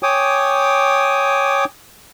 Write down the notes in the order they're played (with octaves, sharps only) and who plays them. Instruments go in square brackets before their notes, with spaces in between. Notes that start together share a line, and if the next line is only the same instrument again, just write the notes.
[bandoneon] C#5 G5 G#5 D6 D#6